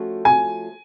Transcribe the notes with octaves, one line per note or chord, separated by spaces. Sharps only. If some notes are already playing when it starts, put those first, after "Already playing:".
Already playing: F3 A3 C#4 F#4
G#5